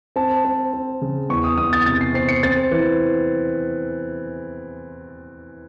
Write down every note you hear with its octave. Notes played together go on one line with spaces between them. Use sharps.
C4 A5
C4
C4
C#3
E2 C#6
D#6
E2 D#6
A6
C3 A6
C7
C4 C7
C#7
C4 A6
E3